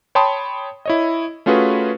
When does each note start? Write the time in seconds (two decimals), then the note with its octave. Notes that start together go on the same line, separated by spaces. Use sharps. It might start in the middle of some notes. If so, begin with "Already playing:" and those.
0.15 C#5 G5 A5 B5 C6 D#6
0.85 E4 C#5 D#5
1.46 A3 C#4 F4 F#4 G#4 B4